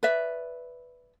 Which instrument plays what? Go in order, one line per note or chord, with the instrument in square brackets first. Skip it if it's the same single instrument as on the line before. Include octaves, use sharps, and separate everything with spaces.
[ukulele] B4 D5 E5